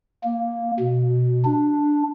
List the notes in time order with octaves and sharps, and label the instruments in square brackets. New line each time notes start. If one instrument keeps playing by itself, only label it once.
[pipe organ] A#3
B2
D4